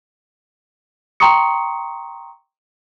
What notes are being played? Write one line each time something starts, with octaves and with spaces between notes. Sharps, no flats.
G5 A#5 C6 C#6 D#6 C#7